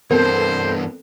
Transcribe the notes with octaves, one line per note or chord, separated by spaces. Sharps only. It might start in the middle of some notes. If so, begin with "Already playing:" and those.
G2 E3 B3 C4 A4 A#4 C5